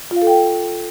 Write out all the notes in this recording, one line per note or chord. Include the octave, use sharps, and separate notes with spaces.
F4
F5
A4
G5